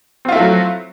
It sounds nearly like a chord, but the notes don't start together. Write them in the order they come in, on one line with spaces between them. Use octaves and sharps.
C4 F4 E4 A3 F#3